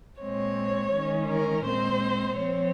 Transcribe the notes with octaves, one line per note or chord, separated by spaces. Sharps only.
A#2 G#3 C4 C#5
D#3 G#3 C#4
A#4
A#2 G#3 C4 C5
F3 C4 C#5